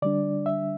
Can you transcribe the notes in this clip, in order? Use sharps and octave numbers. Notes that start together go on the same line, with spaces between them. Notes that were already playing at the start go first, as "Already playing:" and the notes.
D3 G3 D4 D5
E5